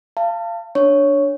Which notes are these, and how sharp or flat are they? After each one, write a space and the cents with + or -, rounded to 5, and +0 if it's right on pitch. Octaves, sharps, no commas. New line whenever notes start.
F5 -25 A5 +25
D4 -5 C#5 +0